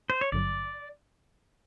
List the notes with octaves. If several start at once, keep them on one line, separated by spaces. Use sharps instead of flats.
C5
C#5
G#1 G2 D3 F#3 D5